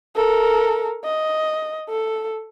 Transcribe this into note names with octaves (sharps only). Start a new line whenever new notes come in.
A4 A#4
D#5
A4